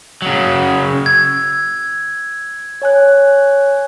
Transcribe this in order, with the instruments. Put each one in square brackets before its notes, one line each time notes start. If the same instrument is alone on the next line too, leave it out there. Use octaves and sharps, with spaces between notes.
[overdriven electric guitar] C#3 F#3
[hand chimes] E6 [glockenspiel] G#6
[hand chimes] C#5 G#5 F#6